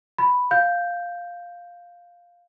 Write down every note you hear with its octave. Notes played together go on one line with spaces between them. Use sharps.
B5
F5 G6